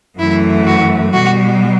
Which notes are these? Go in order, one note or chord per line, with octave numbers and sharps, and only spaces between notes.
F#2 E3 A3 E4
F#4
B2 G3 F#4